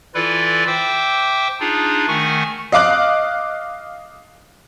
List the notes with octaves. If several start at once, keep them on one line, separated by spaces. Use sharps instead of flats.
E3 E4 F4 A4 B4 D5
C5 E5 G5 D6 E6
D4 D#4 F4 G#4
D#3 A3 F#5 G#5 C#6
D#5 F5 D6 F#6